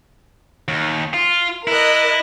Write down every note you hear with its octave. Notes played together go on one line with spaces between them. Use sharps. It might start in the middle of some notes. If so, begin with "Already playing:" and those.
D#2
F4
E4 A#4 D#5 F#6